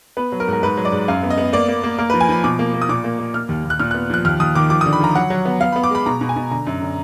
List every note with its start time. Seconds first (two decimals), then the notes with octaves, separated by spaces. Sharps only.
0.17 B3 B4
0.32 F#3
0.40 A#4
0.48 G#2
0.53 A#4
0.63 G#2 B4
0.77 F#3
0.85 D5
0.92 G#2
1.08 F#2 F5
1.23 B3
1.30 D#5
1.37 B3
1.53 A#3 D5
1.68 A#3
1.84 A#3
1.98 A#3 A#4
2.10 F3 B4
2.21 G#5
2.29 F3 B5
2.44 B2 D6
2.59 A#3
2.74 A#3
2.82 D#6
2.89 A#2 D6
3.04 A#3
3.19 A#3
3.34 A#3 F6
3.49 D#2
3.65 D#2
3.70 F#6
3.79 A#2 F6
3.91 B3 F#6
4.10 F3 F#6
4.25 D#2 F6
4.40 D#2 D#6
4.55 D#3 D6
4.70 F3 D6
4.81 D3 D#6
4.93 B5
5.00 F3 A#5
5.15 F#3 F#5
5.30 F#3
5.45 B3
5.61 B3 F5
5.72 B3 B5
5.83 D6
5.91 G#3 B5
6.06 B2 A#5
6.21 B2
6.29 G#5
6.36 B2
6.51 D3 A#5
6.67 F#2
6.82 D3